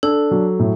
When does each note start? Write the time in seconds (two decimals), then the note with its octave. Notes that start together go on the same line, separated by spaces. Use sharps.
0.03 D4 A4
0.31 F#3
0.59 A2